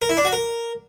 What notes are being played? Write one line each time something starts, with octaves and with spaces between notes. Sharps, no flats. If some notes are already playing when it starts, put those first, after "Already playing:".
A#4
E4
D4
F#4
A#4